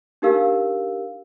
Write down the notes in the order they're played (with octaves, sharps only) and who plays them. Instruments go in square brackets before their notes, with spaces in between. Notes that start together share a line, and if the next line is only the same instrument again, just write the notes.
[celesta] D4 D#4 G4 A#4 F5 E6